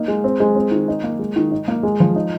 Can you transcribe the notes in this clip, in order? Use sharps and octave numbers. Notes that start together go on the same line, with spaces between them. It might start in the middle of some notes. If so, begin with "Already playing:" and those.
Already playing: A#3 D#4
G#3
C4
G#3
C4
D#3
D#4
A#3
G#3
D#3
D#4
A#3
G#3
F3
D#4